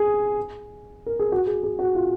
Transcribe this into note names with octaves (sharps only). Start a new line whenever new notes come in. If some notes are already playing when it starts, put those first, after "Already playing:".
Already playing: G#4
A#4
G#4
F#4
G#4
G#4
F#4
F4